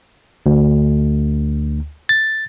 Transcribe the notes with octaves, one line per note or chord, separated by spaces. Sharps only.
D2
A6